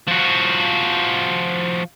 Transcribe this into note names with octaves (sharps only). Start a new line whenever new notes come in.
F3 F#4